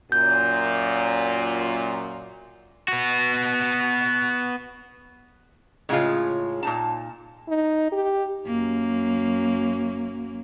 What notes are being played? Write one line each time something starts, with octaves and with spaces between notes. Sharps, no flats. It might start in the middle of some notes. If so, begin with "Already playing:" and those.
F#2 A#2 G6
B3 F#4
A2 C#3 G#3 C#4 D#4 F4
A#2 D#4 A5
D#4
G4
F#2 F#3 A#3